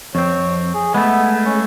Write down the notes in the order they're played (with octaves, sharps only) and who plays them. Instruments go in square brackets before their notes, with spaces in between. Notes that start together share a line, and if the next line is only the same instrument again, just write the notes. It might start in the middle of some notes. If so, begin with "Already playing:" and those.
[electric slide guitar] F2 C4 [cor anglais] C#5
[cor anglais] G#4
[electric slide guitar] G#3 A3 [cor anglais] B3
[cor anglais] C#4